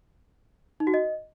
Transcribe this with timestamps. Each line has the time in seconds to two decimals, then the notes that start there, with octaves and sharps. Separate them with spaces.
0.80 D#4
0.87 F#4
0.94 D#5